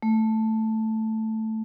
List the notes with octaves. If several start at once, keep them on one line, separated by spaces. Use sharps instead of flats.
A3